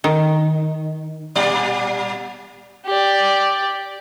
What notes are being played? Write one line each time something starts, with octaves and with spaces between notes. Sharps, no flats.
D#3
A#2 G3 D5
G4 D5